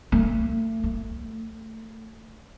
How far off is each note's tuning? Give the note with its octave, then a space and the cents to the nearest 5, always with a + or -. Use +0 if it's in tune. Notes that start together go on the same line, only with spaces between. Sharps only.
A3 +35
A3 +20